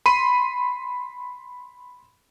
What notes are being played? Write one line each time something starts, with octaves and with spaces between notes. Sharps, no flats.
B5 C6 D#7